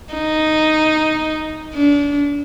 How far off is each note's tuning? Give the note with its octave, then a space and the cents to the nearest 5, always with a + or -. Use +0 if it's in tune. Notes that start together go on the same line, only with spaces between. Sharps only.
D#4 +0
D4 -30